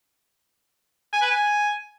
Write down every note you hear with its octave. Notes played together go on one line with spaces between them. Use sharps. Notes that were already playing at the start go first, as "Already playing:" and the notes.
G#5
B4
G#5